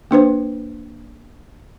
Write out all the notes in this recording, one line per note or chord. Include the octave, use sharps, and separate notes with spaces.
A#3 D4 B4 C5